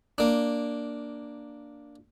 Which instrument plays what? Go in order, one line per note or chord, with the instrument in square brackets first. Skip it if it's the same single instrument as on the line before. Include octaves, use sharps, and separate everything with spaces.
[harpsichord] A#3 D4